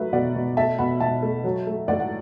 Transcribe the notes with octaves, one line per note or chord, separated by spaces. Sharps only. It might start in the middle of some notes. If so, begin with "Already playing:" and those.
Already playing: F#3 A3 F#4 B4 E5
B2 D5 F#5
B2
A3 E5 A5
B2 F#5 B5
B2 E5 A5
A3
F#3
A3
A2 D5 F#5
F#5